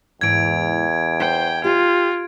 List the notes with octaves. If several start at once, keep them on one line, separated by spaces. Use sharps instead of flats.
E2 G#2 E3 G#6 D7
C5 G5
F4 G4